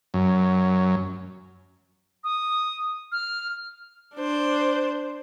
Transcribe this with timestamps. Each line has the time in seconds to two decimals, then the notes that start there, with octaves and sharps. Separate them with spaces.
0.14 F#2
2.24 D#6
3.12 F6
4.16 D4 C5